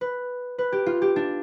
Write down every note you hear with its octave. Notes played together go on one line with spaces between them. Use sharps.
B4
B4
G4
F4
G4
D4